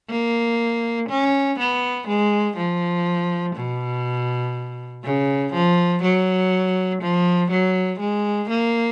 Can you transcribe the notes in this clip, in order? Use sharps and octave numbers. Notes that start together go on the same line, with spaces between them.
A#3
C#4
B3
G#3
F3
B2
C#3
F3
F#3
F3
F#3
G#3
A#3